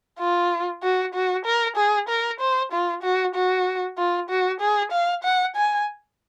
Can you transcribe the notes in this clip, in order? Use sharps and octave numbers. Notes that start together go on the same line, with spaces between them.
F4
F#4
F#4
A#4
G#4
A#4
C5
F4
F#4
F#4
F4
F#4
G#4
F5
F#5
G#5